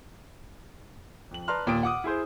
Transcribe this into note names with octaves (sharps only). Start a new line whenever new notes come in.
F2 F#7
B4 D5 A5 A#5 C6 F6
D#2 A#2 G5 D#6 D7
F#5 D6 D#6
E4 G#4 C5